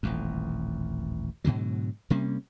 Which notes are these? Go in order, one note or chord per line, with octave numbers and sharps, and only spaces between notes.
D#1 A1 F2
G#2 B2 D3 F#3
C3 G3 A#3 C#4